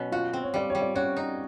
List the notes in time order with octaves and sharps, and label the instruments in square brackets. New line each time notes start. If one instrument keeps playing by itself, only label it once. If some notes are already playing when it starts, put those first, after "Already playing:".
Already playing: [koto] B2 F#3 C#4
[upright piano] F4 F5 [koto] F#4
[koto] C4
[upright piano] C#5
[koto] G3 [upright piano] D5
[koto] G3 [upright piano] C#5
[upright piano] D5
[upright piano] C#4 C#5 [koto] F#4
[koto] D#4